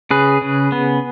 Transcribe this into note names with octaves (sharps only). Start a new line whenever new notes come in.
C#3 G#4 B4
C#3
B3